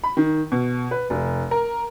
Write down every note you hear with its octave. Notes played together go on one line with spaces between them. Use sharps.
B5
D#3
B2
B4
F1
A#4